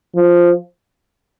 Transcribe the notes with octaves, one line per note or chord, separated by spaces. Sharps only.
F3